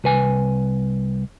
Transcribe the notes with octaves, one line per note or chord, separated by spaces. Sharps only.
C2 B4 G#5